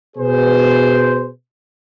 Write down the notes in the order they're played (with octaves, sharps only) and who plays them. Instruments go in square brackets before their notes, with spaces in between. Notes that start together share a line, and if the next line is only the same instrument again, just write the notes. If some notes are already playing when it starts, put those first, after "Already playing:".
[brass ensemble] B2 G#4 B4 C5